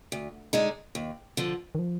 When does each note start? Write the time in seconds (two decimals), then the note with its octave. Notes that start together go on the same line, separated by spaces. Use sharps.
0.12 D2
0.53 D3 G#3 D#4
0.95 D#2
1.37 D3 F3
1.75 D#3
1.79 F3